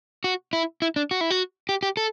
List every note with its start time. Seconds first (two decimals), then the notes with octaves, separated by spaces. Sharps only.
0.24 F#4
0.53 E4
0.82 E4
0.96 D4
1.11 F#4
1.21 E4
1.30 F#4
1.69 G4
1.83 G4
1.97 A4